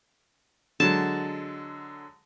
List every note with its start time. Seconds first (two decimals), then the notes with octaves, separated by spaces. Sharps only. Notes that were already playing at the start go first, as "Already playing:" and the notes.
0.80 D3 F#3 G#3 A5